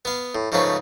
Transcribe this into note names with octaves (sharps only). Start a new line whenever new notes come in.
B3 F5
A2
G#2 C#3 F3 A3 C#4 B4